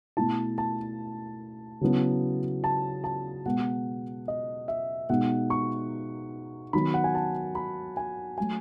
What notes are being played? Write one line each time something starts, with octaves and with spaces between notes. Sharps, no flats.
B2 A3 E4 A5
A5
C#3 F#3 B3 E4
A5
A5
B2 G#3 B3 F#5
D#5
E5
B2 G#3 D#4 F#5
C#6
D#3 F#3 B3 B5
F#5
G#5
A5
B5
G#5
F#3 A3 G#5